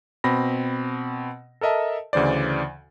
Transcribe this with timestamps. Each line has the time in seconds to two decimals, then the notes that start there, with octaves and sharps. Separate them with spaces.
0.24 B2 C4 B5 A#6
1.61 A4 A#4 D#5 E5 A5
2.13 D2 C#3 E3 C5 D5